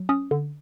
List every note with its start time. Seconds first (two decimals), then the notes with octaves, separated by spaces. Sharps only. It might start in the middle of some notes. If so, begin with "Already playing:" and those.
Already playing: F#3
0.09 C#4 D#6
0.31 D3